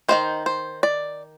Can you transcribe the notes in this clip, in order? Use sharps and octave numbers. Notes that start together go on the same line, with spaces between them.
D#3 A#3 D#4 C5
C5
D5